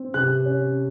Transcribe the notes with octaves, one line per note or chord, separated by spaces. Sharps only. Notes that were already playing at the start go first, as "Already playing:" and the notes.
Already playing: C4
C3 F#6
C#4